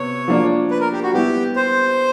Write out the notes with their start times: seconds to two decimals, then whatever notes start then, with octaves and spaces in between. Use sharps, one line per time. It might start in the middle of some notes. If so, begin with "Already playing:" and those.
Already playing: C3 B3 C#5
0.28 F3 A#3 D4
0.71 B4
0.81 A#4
0.92 G4
1.03 F#4
1.13 G3 B3 E4 G4
1.56 C5